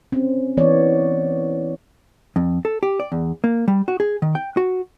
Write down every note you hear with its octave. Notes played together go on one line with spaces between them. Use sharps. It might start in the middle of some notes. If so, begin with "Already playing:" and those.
C4 C#4
E3 B3 C#5 D5
F2
A4
G4
D5
E2
A#3
G3
F#4
G#4
D#3
G5
F#4